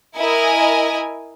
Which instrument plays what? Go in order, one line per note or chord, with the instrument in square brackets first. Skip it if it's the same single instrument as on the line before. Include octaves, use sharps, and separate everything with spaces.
[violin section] E4 A#4 D#5 G#5